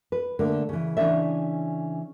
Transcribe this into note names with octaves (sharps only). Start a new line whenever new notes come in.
B4
D3 A3 A#3
C#3 E3
C#3 E3 A3 C#4 D4 E5